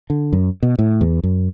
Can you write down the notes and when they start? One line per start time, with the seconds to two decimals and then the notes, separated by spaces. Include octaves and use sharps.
0.10 D3
0.33 F#2
0.63 B2
0.79 A2
1.01 E2
1.24 F#2